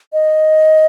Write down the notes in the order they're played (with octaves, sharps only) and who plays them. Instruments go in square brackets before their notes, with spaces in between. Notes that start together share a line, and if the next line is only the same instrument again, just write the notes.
[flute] D#5